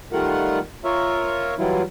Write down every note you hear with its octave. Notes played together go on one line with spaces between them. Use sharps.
D#3 G3 A3 F4 A#4 F#5
F4 A#4 C#5 E5
E3 F#3 G3 E4 F4